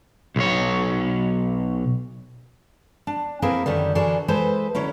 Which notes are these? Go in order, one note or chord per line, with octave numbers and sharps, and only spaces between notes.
B1 C#5
D4
A#3 C4 E4 G#4 A#4 B4
F#2 D3 D#3 G3
D3 E3 D4 F#4 G#4 A#4
E3 G#3 A4 B4 C5
D3 F#3 C#4 E4